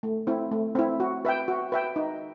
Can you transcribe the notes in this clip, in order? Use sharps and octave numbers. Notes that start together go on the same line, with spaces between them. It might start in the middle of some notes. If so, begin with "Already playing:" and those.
A3
C4 E4
A3
C4 E4
F#4
B4 E5 G5
F#4
B4 E5 G5
D#4